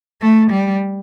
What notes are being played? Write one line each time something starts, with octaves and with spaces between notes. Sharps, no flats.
A3
G3